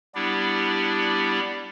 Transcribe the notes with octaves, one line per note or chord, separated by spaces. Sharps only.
G3 B3 D4 E4 G4 D5